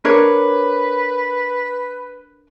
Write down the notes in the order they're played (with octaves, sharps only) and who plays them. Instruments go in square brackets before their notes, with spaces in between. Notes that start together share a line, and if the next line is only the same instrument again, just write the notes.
[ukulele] D4 A#4 C#5 [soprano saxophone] B4